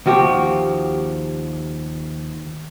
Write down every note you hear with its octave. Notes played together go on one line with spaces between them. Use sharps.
D#2 F3 F#4 G4